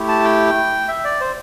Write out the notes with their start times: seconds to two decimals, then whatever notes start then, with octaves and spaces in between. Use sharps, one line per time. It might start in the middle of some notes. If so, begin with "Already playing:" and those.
Already playing: A3 E4 G4
0.08 A5
0.24 G5
0.88 E5
1.04 D5
1.21 C5